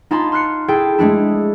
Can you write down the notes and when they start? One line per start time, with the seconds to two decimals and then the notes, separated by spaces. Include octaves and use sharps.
0.11 D#4 F4 G#5 A5 B5 C6
0.32 C6 F6 F#6 C7 C#7
0.68 E4 G#4 A4 G5 A5
0.98 G#3 A3 D4 E4